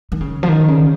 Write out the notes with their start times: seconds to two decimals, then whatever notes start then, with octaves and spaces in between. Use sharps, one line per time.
0.12 D#3
0.21 C#3
0.43 F3
0.49 D#3
0.68 C#3